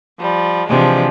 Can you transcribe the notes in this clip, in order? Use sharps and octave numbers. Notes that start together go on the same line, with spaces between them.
F3 G3
C3 E3 F3 G#3 D4